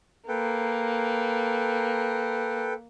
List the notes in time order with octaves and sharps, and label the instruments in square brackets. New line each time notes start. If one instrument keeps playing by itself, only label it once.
[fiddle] A#3 [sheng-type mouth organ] A4 B4 G5